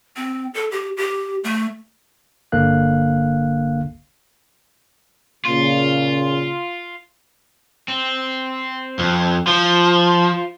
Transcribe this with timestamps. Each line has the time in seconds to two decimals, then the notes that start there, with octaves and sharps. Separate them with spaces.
0.16 C4
0.54 A4
0.72 G4
0.97 G4
1.44 A3
2.52 G1 D3 A#3 F5 F#6
5.45 A#2 C#3 F4
7.88 C4
8.99 F2
9.47 F3 F4 C5